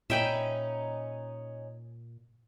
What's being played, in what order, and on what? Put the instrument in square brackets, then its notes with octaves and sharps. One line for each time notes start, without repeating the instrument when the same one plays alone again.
[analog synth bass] A#2 [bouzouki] C#4 D#4 [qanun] E5 G5 B5